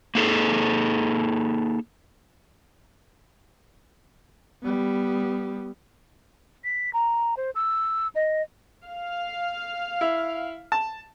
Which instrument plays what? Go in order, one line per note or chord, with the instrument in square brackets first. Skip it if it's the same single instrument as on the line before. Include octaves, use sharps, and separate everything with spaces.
[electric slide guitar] A#3 D#4 G#4 A4
[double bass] G3 B3
[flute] B6
A#5
C5
E6
D#5
[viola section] F5
[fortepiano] E4
A5